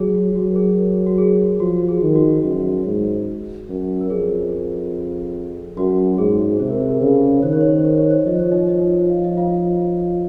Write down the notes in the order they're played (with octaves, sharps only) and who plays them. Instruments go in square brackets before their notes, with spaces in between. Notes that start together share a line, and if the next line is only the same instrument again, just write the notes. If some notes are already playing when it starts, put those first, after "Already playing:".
Already playing: [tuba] F#3 [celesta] G#4
[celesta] F#4
[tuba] F#3 [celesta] F#4
[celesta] A#4
G#4
A#4
F#4
G#4
[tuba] F3 [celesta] F#4
[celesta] G#4
[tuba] D#3
[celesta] F#4
[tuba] F#2 [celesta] F#4
[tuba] G#2
F#2
[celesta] A#4
[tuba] F2 [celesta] G#4
[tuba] F#2 [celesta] F#4
[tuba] G#2 [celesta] G#4
[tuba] C3 [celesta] C5
[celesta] A#4
G#4
A#4
C5
[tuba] C#3 [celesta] A#4
[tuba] D#3 [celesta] C5
[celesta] C#5
C5
C5
C#5
C5
[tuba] F3 [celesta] D#5
[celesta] C#5
D#4 D#5
D#4 D#5
F5
D#5
F4 F5